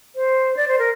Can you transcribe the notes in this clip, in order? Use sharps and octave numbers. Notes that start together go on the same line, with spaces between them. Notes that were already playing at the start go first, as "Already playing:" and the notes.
C5
D5
C5
A#4